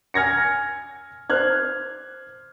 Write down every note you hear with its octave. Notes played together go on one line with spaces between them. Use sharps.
G#5 F6 G#6 A#6 C#7
C5 F6 F#6 G#6